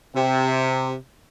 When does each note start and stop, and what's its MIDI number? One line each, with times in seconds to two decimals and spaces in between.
0.16 0.94 48